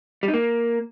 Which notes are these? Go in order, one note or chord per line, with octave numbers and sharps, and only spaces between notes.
G3
D#4
A#3